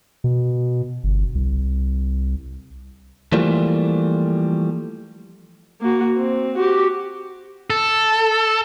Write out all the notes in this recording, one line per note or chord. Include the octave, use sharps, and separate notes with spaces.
B2
G1
C2
E3 F3 G3 A3 A#3
A#3 F#4
C4
F#4 G4
A4